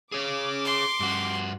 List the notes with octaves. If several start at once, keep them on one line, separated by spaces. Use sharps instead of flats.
G#4 C#5 D6
C6
G2 F#4